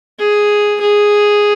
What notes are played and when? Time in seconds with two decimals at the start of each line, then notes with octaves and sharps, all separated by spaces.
0.19 G#4
0.81 G#4